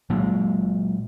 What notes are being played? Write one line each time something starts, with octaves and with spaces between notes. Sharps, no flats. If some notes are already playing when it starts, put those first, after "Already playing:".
A#2 F#3 G#3